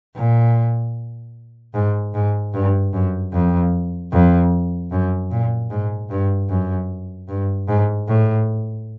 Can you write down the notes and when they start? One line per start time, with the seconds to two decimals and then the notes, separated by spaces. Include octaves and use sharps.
0.16 A#2
1.74 G#2
2.14 G#2
2.53 G2
2.93 F#2
3.33 F2
4.12 F2
4.91 F#2
5.31 A#2
5.70 G#2
6.10 G2
6.50 F#2
7.29 G2
7.68 G#2
8.08 A2